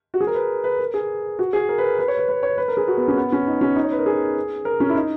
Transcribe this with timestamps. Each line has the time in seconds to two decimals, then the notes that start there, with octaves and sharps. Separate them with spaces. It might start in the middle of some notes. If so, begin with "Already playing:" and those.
0.14 F#4
0.21 G#4
0.27 A#4
0.35 B4
0.64 B4
0.79 A#4
0.94 G#4
1.39 F#4
1.53 G#4
1.69 A#4
1.78 B4
1.84 A#4
1.99 B4
2.08 C#5
2.18 B4
2.28 B4
2.43 C#5
2.58 B4
2.68 A#4
2.77 G#4
2.88 F#4
2.97 B3
3.08 C#4
3.17 B3
3.32 C#4
3.47 D#4
3.61 C#4
3.76 D#4
3.84 C#5
3.92 B4
3.99 A#4
4.06 G#4
4.65 A#4
4.80 C#4
4.89 E4
4.95 D#4